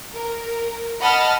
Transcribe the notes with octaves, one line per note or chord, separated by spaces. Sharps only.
A#4
D#5 F#5 A5 B5 F6